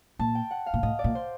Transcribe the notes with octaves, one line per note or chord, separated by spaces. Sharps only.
A#2 A5
G5
F#5
F5
A#2
A2 D#5
D5
A#2
C5